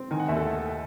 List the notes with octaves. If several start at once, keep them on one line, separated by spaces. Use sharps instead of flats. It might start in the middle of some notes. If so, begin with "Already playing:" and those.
Already playing: C4
D#3 G#5
F#5
D#2 E5
A4
A3